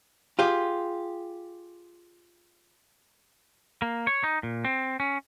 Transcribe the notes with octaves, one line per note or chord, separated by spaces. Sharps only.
F4 G4 G#4
A#3
C#5
D#4
A#2
C4
C#4